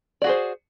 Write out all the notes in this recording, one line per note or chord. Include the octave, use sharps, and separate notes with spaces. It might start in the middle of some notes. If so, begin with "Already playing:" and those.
F#4 G#4 C5 D5